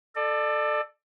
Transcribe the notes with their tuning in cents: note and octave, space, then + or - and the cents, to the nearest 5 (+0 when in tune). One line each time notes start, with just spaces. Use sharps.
A4 +0 D5 +30